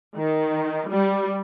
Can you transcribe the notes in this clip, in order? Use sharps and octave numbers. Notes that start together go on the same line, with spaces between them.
D#3
G3